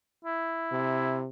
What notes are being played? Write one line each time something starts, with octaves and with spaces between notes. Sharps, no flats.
E4
C3